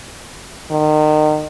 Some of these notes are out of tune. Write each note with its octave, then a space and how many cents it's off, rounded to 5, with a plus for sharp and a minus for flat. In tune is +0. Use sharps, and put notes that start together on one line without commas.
D#3 -30